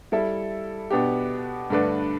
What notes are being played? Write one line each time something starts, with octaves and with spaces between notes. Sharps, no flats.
G3 E4 A4 E5
B2 B3 D4 G4
G2 D3 A3 D4 B4